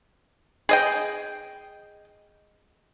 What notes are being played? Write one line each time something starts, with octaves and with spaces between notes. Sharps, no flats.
G#4 D#5 G5